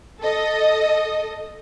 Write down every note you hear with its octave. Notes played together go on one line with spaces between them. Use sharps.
A4 D#5